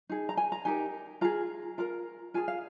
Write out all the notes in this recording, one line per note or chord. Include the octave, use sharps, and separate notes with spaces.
D#4 G#4
A#5
G#5
A#5
D#4 G4 A#4 G#5
F4 G#4 A#5
F4 A#4 A#5
F4 G#4 G#5
F5